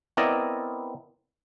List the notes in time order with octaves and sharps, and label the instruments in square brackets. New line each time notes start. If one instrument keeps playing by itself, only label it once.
[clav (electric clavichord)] B3 C4 E4 A#4 D5 D#5